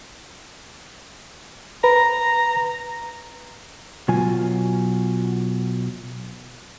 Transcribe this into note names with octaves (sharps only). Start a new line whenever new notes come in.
B4 A#5
B2 F#3 F4 G#5